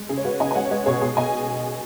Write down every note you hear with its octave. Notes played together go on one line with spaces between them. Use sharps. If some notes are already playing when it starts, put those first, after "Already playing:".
Already playing: G#3
C#3 G#4
C#5
G#3 F#4 B4
C#3 D#5 G#5
G#5
G#3 C#5 F#5
C#5
G#3 B4 D#5
B2 G#4 C#5
B2 G#4
B2 D#5 G#5